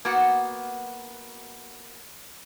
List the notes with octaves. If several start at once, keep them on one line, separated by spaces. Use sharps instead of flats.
A#3 B3 F#4 F#5